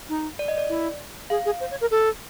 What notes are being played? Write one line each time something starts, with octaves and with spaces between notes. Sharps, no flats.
D#4
D5
D#5
D5
E4
G#4 F5
G#4
C5
C#5
A#4
A4